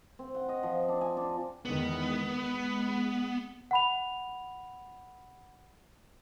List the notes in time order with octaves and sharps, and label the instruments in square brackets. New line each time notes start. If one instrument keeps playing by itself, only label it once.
[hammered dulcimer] C4
F#5
D#5
F3
D4
G#5
D4
[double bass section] E2 D#3 G#3 [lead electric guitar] B3
[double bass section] G#3
[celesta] F#5 B5 F7